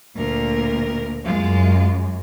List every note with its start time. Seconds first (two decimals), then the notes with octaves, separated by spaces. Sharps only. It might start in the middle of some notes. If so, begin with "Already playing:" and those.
0.16 D2 A#2 A#4
1.25 F#2 G#3 F4